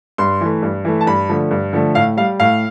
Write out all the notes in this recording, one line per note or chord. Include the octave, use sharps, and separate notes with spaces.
G2 C6
E3 A3
G2
E3 A3
A5
G2 B5
D3 F3 A3
G2
D3 F3 A3
A2 F5
G3 F5
A2 F5